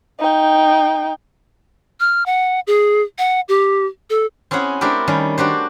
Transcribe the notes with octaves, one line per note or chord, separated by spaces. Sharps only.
D#4 G5
F6
F#5
G#4
F#5
G4
A4
C4 C#4 E4 G#4 F#5
A3 C4 D4 E4 G4 A#4
D#3 G3 C#4
D4 F#4 G4 C5